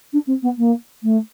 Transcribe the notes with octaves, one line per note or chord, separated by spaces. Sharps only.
D4
C4
B3
A#3
A3